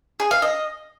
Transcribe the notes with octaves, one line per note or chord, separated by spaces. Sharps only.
G#4
F5
D#5